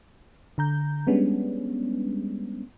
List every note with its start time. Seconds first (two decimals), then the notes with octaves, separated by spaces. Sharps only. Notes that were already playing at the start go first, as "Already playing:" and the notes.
0.58 D3 A#5 G6
1.07 G3 G#3 B3 C#4 D4